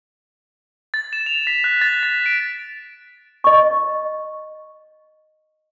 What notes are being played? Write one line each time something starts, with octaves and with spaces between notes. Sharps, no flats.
A6
E7
F7
B6
F#6
A6
B6
D7
D#5 C#6